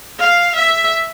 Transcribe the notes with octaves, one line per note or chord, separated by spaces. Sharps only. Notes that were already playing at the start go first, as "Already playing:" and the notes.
F5
E5